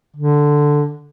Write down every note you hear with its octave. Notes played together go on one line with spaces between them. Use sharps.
D3